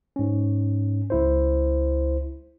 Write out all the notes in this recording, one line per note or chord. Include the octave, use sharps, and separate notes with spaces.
G#2 C#4
C#2 E4 C5